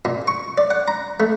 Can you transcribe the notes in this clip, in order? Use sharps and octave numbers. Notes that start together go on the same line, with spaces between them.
A#2
C#6
D5
F#5
A#5
A3